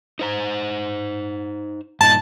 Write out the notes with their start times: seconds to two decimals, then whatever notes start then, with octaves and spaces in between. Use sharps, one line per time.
0.19 D#4 C5 A#5
2.01 G2 A#2 D#4 A5